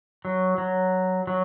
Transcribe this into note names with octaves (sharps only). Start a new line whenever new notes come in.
F#3
F#3
F#3